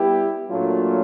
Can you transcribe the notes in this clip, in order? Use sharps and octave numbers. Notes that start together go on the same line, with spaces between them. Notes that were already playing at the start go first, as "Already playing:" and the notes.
Already playing: G3 B3 E4 G4
A#2 F#3 A3 D4 F4